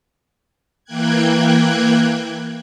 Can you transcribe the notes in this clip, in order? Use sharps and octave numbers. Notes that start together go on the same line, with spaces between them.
E3 A#3 G5 F#6 G#6